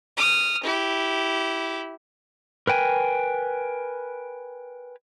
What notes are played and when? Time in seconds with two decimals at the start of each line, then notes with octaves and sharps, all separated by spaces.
0.17 D#6 F6
0.63 E4 G4
2.67 A#4 B4 G5 G#5